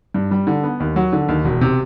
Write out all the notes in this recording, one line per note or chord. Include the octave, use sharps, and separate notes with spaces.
G2
G3
D3
B3
D#2
F#3
D3
D#2
E1
C3